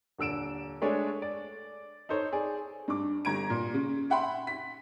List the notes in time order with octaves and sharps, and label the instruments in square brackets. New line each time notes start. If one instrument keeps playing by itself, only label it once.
[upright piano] D#1 D3 E6 D7 E7
G#3 A3 D4 C#5 D5 G#5
D5
D#4 A4 C5 C#5
G#4 D5
G2 D6
G1 A#5 G#6 D7
A#2
C#3
E5 F#5 G5 B5 C6
B6